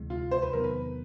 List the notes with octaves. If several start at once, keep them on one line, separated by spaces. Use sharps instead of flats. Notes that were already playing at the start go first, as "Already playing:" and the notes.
Already playing: D2 C3 E3 G#3
F4
C5
B4
E2 C3 D#3 F#3 B3 A#4
B4